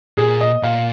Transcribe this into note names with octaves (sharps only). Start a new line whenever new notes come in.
A#2 G#4
D#5
A#2 F5